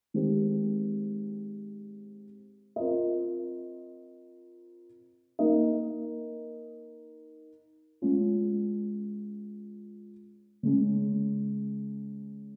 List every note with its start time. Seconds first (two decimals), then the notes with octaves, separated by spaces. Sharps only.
0.14 D#3 G#3 C4 G4
2.76 C4 F4 A#4 D#5
5.39 A#3 D#4 A#4 D#5
8.02 G#3 C#4 F4
10.63 C#3 G#3 C#4